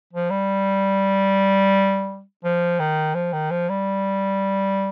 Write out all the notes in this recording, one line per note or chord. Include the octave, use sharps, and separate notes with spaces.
F3
G3
F3
D#3
F3
D#3
F3
G3